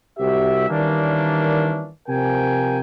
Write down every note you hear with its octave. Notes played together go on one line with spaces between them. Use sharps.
C2 F#4 G4 E5
D#3 E3 G3 A#3 C#4 D4
C3 F3 A#4 G5 G#5